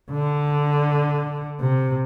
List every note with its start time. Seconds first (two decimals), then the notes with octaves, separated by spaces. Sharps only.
0.11 D3
1.60 C3